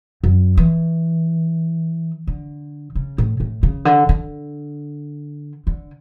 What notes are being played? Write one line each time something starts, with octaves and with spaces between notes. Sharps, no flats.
F#2
E3
D3
C#3
A2
A2
C#3
D3
D3
D3